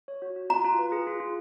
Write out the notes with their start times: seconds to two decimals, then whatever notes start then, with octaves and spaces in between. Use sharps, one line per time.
0.08 C#5
0.22 F#4
0.36 F#4
0.50 F4 A#5
0.65 F4
0.79 B4
0.92 G#4
1.07 F4
1.20 F4